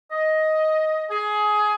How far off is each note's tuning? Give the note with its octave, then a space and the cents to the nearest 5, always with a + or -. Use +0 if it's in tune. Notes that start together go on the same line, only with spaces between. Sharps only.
D#5 +10
G#4 +20